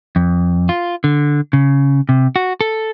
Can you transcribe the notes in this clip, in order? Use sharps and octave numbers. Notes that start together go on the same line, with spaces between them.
F2
F4
D3
C#3
C3
F#4
A4